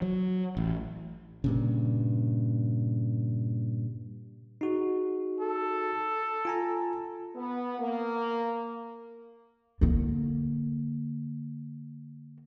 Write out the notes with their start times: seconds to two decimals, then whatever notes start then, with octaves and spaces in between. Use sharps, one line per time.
0.02 F#3
0.57 A1
1.44 G2 A#2 C#3
4.61 D#4 F#4 G#4
5.41 A4
6.45 F4 G#5 A#5
7.36 B3
7.80 A#3
9.81 D3 A#3